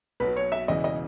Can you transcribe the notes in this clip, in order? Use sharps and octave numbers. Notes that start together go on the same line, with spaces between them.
B1 B2 F#3 B4
C#5
E5
E1 E2 C#3 E3 D#5
D#5